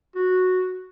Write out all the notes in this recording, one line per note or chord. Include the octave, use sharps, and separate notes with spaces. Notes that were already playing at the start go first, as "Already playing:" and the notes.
F#4